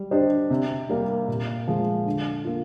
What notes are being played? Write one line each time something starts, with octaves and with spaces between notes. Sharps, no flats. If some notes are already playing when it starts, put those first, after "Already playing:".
Already playing: G3
D4 G4 C5 D#5
C3
G3 A#3
A#2
F3 G#3
D3
A#3 F4